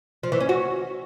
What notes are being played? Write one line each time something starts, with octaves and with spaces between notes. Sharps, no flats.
F3
E3
C#4
F#4